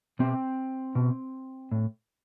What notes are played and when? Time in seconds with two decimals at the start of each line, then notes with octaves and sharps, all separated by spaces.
0.19 B2 C4
0.95 B2
1.72 A2